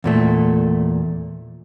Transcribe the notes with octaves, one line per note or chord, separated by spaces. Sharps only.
E2 A#2 A3